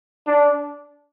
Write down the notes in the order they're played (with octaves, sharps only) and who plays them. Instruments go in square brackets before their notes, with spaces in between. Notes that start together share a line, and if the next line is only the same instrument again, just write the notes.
[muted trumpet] D4